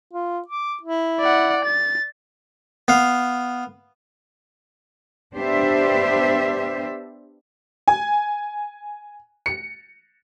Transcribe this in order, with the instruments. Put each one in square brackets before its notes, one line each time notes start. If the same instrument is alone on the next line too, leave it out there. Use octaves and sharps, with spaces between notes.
[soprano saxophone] F4
D6
E4
[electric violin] D5 F#5
A6
[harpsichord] B3 F5
[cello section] B3 D4 G4 C5 E5
[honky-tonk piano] G#5
C#7